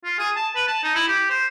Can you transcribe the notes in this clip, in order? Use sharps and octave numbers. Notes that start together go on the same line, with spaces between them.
F4
G#4
A5
B4
A5
D#4
E4
G4
C5